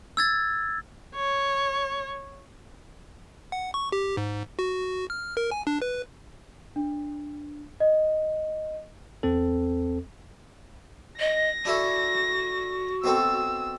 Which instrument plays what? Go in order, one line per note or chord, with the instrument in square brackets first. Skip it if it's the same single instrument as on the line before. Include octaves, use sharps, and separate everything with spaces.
[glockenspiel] E6 G#6 A6
[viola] C#5
[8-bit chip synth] F#5
C#6
G4
G#2
F#4
F6
A#4
G#5
D4
B4
[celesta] D4
D#5
[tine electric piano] E2 C4 A4
[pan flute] D#5 [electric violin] A#6
[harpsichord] D4 E4 A4 [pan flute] F#4
[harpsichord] B2 C4 A4 [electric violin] E6